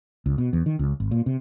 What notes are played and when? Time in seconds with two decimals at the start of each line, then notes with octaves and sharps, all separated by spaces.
0.26 C#2
0.38 B2
0.53 E2
0.66 D#3
0.79 C#2
1.00 G#1
1.11 A#2
1.26 C3